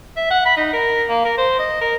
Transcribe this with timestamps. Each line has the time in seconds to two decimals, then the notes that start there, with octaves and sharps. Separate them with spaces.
0.17 E5
0.31 F#5
0.46 B5
0.57 D#4
0.73 A#4
1.09 A#3
1.25 A#4
1.38 C5
1.59 D#5
1.81 A#4